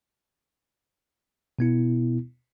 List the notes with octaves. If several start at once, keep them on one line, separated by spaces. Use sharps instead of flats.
B2 B3 E4